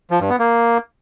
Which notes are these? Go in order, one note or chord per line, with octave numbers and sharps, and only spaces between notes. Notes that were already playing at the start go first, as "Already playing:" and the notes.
F3
G2
B3
A#3